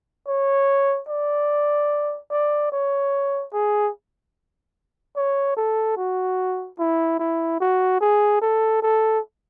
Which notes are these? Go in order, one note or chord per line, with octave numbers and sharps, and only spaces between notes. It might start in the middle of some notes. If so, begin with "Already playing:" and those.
C#5
D5
D5
C#5
G#4
C#5
A4
F#4
E4
E4
F#4
G#4
A4
A4